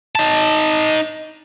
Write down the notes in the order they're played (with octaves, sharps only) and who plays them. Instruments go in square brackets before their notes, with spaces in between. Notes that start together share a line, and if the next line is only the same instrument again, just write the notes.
[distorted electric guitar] D#4 A5